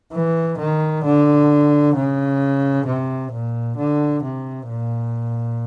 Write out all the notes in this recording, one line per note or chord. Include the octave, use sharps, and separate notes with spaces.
E3
D#3
D3
C#3
C3
A#2
D3
C3
A#2